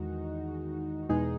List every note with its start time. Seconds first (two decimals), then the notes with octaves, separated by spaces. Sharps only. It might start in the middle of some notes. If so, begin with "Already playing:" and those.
Already playing: E2 D#3 G#3 D#4 F#4
1.09 E2 B2 G#3 D#4 G#4